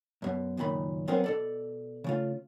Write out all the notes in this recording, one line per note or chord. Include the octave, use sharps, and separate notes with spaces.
F#2 B2
C#2 F#2 A#2 D#3 B5
F#3 B3 C4 G#4 A#4 C5
B2 A4 D5
C#3 A3 F4